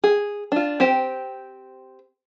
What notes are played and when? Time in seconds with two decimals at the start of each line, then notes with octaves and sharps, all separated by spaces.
0.04 G#4
0.52 D4 F4
0.80 C4 G4 C5 G5